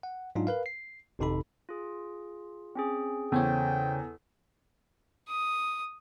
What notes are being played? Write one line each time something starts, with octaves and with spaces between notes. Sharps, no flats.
F#5
G#2 F#3 D4 D#4 F4
A#4 B4 F5
C7
G#1 F2 C3 D#4 A4 B5
F4 G#4
C4 C#4 G#4
E2 C#3 A4 C5 C#5 G5
D#6